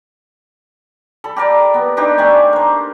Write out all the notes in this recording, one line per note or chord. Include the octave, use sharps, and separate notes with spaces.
A4 B5
G4 A#4 D5
B3
D4 D#4 G4 C5
A3 G4 D5 G#5
A#4 C5